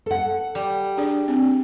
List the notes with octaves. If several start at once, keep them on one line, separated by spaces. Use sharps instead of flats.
A4 F#5
G3
D4 G#4 D5
C4 D4